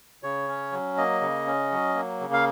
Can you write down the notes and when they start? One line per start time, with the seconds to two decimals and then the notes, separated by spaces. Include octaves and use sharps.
0.23 C#3 C#5
0.48 C#4
0.72 F#3
0.97 A#3 D#5
1.21 C#3
1.47 C#4
1.71 F#3
1.95 A#3
2.20 C#3
2.33 F5